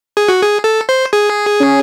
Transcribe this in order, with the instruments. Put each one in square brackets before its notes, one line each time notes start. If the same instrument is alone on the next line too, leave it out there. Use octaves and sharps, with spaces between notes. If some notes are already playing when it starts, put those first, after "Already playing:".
[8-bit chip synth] G#4
F#4
G#4
A4
C5
G#4
[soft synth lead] C#4